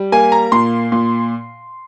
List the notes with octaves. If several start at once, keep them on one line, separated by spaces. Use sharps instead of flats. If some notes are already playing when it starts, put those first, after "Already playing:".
Already playing: G3
A#3 G#5
A#5
A#2 C6
A#2